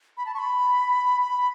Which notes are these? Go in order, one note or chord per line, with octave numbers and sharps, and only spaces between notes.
B5
A5
C#6
B5
B5